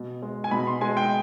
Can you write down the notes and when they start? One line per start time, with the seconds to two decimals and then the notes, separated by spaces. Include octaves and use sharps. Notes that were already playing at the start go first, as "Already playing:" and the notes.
Already playing: B2
0.22 G#3
0.44 G#5
0.51 B2 B5
0.67 C6
0.81 G#3 G#5
0.97 G5